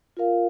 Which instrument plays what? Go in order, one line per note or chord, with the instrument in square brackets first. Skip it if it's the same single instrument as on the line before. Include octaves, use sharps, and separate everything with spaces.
[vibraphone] F4 A#4 F5